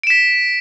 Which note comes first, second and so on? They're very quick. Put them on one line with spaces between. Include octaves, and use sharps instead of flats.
D7 E7 B6